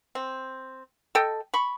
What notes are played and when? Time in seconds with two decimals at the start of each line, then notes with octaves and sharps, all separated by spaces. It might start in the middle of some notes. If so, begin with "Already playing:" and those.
0.15 C4
1.15 A4 D#5 G5
1.54 B5 C#6